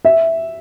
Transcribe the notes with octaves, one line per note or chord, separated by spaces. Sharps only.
E5